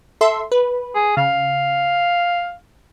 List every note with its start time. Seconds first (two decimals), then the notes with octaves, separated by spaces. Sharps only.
0.21 A4 E5 C6
0.52 B4
0.95 G#4
1.17 C#3 F5